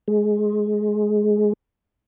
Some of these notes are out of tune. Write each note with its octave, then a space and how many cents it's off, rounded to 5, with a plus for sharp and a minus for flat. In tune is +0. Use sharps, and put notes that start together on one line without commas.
G#3 +15